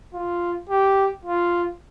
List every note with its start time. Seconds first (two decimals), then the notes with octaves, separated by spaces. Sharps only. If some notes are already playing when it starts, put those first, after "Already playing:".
0.14 F4
0.69 G4
1.25 F4